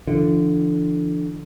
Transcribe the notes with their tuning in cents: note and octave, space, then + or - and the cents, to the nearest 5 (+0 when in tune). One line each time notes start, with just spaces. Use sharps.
D3 +0 F3 -45